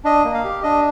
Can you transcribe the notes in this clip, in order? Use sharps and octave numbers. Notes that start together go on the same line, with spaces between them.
D4 D#5
A#3
F5
G4
D4 D#5